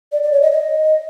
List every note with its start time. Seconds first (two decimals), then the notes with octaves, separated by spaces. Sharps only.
0.12 D5
0.23 D5
0.32 C#5
0.42 D#5
0.52 D#5